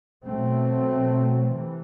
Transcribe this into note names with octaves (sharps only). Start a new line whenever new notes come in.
B2 F#3 A3 C4
C3 E3